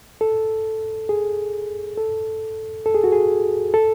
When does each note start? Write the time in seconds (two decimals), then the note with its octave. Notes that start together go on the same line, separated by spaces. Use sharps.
0.21 A4
1.09 G#4
1.98 A4
2.86 A4
2.95 G#4
3.04 F#4
3.12 G#4
3.74 A4